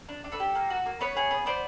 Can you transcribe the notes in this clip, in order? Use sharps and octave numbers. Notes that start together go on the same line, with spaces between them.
D4
D4
A4 B4
G4
A#3
F#4
A#3
B3 B4 C#5
G#4
B3
B3 C5 D5